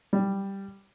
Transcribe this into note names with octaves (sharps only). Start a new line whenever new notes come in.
G3